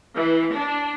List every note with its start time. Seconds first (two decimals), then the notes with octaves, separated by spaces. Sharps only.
0.14 E3
0.53 D4